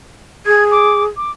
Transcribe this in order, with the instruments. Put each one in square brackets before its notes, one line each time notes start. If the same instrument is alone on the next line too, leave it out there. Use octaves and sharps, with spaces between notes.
[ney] G#4 [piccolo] G#6
[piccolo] D6
D6